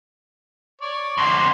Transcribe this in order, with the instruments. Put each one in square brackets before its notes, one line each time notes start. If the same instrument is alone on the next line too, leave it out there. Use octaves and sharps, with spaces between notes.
[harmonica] C#5 D5
[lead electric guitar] F2 D3 [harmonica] C6